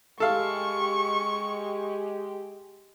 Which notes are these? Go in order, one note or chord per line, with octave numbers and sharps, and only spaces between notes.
G#3 G4 A4 F5 C#6